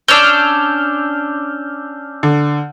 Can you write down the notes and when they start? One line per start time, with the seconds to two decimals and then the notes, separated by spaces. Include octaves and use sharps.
0.08 C#4 D4 E6 F6 G6
2.23 D3